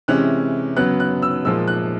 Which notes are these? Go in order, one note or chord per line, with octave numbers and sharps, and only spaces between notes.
C3 E3 G#3 C#4 E4 F#6
C#3 F#3 B3 F#6
F#6
E6
A#2 F3 G#3 E6
F#6